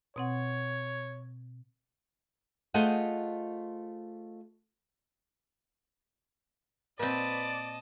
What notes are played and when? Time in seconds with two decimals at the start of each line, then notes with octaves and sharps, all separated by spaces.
0.16 B2 C4 C#5 F#5
2.74 A3 F4 G#4 C5 D#5 F#5
6.99 A#2 C4 B4 D5 D#5 A5